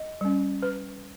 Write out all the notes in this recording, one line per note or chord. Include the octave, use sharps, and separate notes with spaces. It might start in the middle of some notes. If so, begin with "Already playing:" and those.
Already playing: D#5
G3 C#4
B4